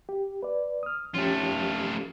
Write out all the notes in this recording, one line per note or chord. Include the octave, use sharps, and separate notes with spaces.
G4
B4 D5
D#6 F6
F3 A3 C#4 F4 G4